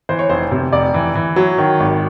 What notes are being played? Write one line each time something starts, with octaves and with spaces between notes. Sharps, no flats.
E3 C5
C#5
F1 C5
C3
F1 D5
E3
E3
F#3
D#3
G#1